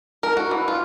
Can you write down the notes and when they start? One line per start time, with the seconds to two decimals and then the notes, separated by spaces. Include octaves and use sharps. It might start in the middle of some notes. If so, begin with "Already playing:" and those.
0.23 A#4
0.37 F#4
0.51 E3
0.68 F4